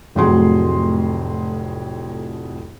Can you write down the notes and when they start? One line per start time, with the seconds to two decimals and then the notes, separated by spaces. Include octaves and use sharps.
0.15 F1 F2 A2 F#3 G#4 C6